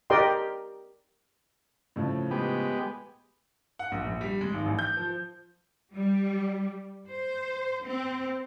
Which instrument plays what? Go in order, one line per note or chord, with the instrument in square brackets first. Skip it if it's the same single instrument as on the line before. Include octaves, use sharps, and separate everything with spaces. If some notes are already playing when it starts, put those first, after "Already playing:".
[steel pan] G4 A#4 D5 D#5 G5 C6
[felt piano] A2 C#3 F3
[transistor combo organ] G#3 B3 G4
[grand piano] F#5
A#1
A#1
G3
G#3
G#1
A1
G6
F3
[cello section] G3
C5
C4